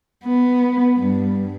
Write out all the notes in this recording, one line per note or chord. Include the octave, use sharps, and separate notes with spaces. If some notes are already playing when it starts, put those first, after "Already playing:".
B3
G2